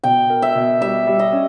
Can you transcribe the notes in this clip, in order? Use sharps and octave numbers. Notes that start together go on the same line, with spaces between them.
B2 G5
A#4
E5
B2
G3 E5
G3
D#5
C#4